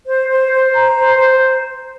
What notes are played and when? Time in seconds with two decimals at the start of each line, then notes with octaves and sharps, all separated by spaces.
0.06 C5
0.29 C5
0.51 C5
0.73 A#5
0.95 C5
1.17 C5